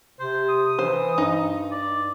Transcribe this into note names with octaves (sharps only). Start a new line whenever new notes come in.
C3 C5
D#6
E3 C5
G2 D#4
D5